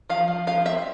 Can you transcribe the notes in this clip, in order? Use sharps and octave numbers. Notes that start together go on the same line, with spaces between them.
F3 F5
F3
F3 F5
C4 E5